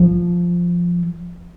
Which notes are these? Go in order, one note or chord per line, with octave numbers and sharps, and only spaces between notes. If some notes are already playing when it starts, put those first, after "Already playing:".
Already playing: F3